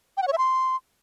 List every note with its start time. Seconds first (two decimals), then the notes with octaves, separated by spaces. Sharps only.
0.17 G5
0.22 F#5
0.28 C#5
0.33 E5
0.38 C6